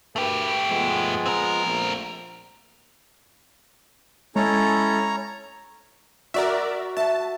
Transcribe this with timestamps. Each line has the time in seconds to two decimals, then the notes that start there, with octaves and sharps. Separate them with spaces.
0.16 D2 A3 G4 A#4 B4
0.69 F3 G#3 B3
1.26 C4 A#4
1.66 A#1 A3
4.36 G#3 C#4 E4 A4 C#5 A#5
6.34 F#4 A#4 D5 E5
6.97 E5 A5